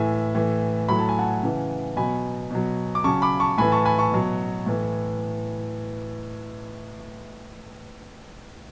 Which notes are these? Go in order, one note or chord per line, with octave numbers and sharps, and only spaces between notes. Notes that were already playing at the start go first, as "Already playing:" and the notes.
Already playing: A2 E3 E5 G#5
A2 E3
A2 F#3 B5
A5
G#5
F#5 A5
C#3 E3
B2 F#3 G#5 B5
B2 F#3
D6
C#3 F#3 A5 C#6
B5 D6
A5 C#6
A2 E3 G#5 B5
A5 C#6
G#5 B5
A5 C#6
B2 F#3
A2 E3